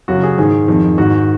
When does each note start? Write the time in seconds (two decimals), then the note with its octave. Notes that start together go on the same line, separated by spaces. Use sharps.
0.08 F#2 C#3 F#4
0.23 G#4
0.38 G#2 D#3 G#4
0.68 F2 D#3
0.98 G#2 D#3 F#4